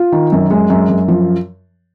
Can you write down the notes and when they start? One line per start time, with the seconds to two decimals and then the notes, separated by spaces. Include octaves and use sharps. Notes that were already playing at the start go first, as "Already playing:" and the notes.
Already playing: F4
0.12 D#3
0.32 F#2
0.51 G#3
0.70 F#2
0.89 F#2
1.08 F3